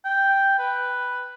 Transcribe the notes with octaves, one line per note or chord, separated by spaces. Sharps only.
G5
B4